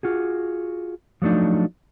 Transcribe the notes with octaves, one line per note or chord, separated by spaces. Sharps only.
F4 F#4 G#4
F3 F#3 A3 D4 D#4